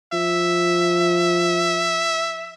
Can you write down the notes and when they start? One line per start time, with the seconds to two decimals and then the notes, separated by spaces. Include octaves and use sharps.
0.13 F3 E5